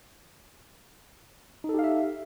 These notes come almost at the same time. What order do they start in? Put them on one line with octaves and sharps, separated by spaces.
D#4 A4 G4 F5 E5